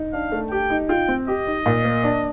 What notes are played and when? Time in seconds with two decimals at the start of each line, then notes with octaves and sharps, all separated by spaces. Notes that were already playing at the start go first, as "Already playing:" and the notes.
Already playing: D#4
0.13 D4 F5
0.32 A3
0.51 G4 G5
0.70 D#4
0.89 F4 G5
1.08 C4
1.28 G4 D#5
1.47 D#4
1.66 A#2
1.85 A#3
2.04 D4